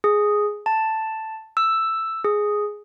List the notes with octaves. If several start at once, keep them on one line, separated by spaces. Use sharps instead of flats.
G#4
A5
E6
G#4